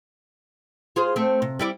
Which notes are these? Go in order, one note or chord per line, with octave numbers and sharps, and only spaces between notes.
F4 G#4 C5
A3 C4
C3
G3 E4 D5